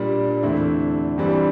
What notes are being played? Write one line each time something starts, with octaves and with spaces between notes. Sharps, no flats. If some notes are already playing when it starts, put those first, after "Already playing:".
Already playing: A#2 G3 D4
E2 D3 A3 C4 E4
G2 E3 G3 C4